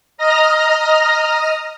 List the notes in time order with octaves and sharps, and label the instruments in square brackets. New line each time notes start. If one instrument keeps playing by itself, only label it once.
[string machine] D#5 A#5 D#6 F6 A#6